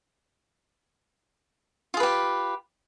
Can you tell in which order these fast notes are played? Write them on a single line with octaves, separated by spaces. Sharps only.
F4 G#4 B4 G4